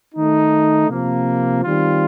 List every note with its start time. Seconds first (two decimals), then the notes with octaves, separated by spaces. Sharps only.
0.15 D#3 A3 D#4
0.89 C3 F3 A#3
1.64 D#3 G3 C4 F4